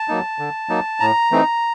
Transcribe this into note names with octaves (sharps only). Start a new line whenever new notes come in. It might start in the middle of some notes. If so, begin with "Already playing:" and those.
Already playing: A5
F#3 A#3 D#4
D3
F#3 A#3 D#4
A2 A#5
E3 A3 C4 D#4